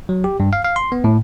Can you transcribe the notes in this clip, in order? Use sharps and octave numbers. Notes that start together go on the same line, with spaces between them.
F#3
G4
G2
F5
F5
C6
B3
A2